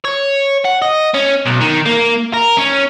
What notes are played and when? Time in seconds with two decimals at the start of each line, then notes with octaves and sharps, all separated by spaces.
0.05 C#5
0.65 F#5
0.82 D#5
1.14 C#4
1.46 B1
1.61 D#3
1.86 A#3
2.34 A#4
2.57 C#4